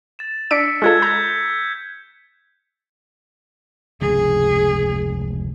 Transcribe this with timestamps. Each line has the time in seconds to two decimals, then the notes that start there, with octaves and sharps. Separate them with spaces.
0.19 A6 E7
0.51 D4 E6 B6 C#7 D7
0.82 G#3 F4 A4 F6 F#6 G#6
1.02 A#5 G6 G#6
4.01 F1 C#2 G2 G#4